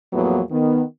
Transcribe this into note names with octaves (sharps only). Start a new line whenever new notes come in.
E2 A2 F3 F#3 A#3 B3
D#3 B3